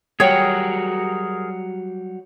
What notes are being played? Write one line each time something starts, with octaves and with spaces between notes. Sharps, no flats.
F#3 G3 F#4 G#4 A#4 C#5 G5